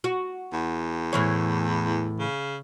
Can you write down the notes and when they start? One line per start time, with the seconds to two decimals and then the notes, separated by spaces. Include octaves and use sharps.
0.04 F#4
0.53 E2
1.13 A2 E3 C#5
2.20 C#3